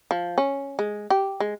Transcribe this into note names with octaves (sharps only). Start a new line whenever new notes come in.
F3
C#4
G#3
G4
G#3